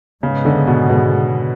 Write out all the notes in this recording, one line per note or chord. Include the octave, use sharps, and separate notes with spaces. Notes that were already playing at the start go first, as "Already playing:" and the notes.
G#2 C#3 G#3 B3
D3
B2
B2